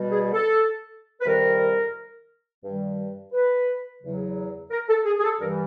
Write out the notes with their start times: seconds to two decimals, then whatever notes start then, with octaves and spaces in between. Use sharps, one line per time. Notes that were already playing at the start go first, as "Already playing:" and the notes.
Already playing: B2 G3
0.11 G#4
0.34 A4
1.21 B4
1.26 F2 C3 D#3 G3 A#4
2.64 G2 D#3 G3
3.33 B4
4.03 E2 C#3 F#3
4.71 A#4
4.89 A4
5.05 G#4
5.19 G#4
5.24 A4
5.40 G2 E3 G3 A#4